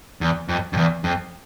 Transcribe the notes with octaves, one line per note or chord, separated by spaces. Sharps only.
E2
F2
F2
E2
F2